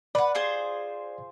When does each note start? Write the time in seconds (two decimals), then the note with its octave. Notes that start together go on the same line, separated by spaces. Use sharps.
0.15 B4 D5 F#5
0.35 F4 G#4 C5